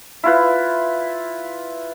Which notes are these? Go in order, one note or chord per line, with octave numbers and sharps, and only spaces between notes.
E4 F4 B4